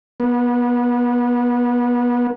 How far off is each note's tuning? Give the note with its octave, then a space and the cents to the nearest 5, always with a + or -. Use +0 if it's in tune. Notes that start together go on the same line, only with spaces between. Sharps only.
B3 -25